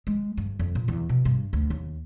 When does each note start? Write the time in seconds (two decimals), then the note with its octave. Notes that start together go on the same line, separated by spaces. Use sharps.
0.07 G#3
0.38 G2
0.59 F2
0.75 A#2
0.88 E2
1.09 B2
1.25 G2
1.53 D2
1.70 D#2